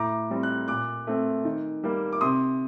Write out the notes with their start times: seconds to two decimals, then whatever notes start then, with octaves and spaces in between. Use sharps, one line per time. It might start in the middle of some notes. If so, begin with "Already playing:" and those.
Already playing: A2 A#5 D6
0.31 G3 C4
0.43 F#6
0.68 A#2 D6 F#6
1.07 A3 C4
1.45 D#3
1.83 G3 A#3
2.12 D6
2.21 C3 C6 D#6